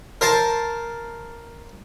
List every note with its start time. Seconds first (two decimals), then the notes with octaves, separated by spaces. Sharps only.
0.21 A#4 C5 A5